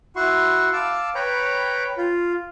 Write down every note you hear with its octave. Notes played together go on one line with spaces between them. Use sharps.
E4 F#4 F#5 C6 C#6
F5 A5 D6 E6
B4 C#5 G5 A#5 B5
F4